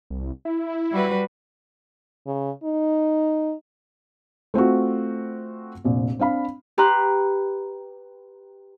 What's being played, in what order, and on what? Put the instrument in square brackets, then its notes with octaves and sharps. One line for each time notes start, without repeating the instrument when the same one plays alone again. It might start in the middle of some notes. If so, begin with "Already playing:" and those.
[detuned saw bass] C2
E4
[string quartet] G3 F#4 B4
[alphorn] C#3
D#4
[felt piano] A3 C4 F4 F#4
F1 A#1
C4 D4 F5 B5
[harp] G4 B4 A#5 C6 F#6